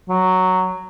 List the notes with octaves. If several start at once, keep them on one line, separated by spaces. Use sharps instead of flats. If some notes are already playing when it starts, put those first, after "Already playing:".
F#3